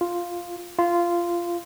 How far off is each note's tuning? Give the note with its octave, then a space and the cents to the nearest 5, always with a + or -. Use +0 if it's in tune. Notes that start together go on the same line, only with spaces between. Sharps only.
F4 +0
F4 -15